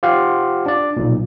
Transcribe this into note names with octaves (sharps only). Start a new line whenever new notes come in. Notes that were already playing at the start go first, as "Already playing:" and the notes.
F4 G4 C5 F5 F#5
D4 D5
B1 A#2